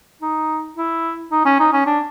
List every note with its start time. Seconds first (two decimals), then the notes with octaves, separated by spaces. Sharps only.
0.22 D#4
0.76 E4
1.31 D#4
1.45 C#4
1.59 D#4
1.73 C#4
1.86 D4